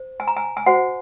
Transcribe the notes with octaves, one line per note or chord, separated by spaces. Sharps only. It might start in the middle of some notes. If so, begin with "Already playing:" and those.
Already playing: C5
G#5
A#5
G#5
G#5
F#4 C5 F#5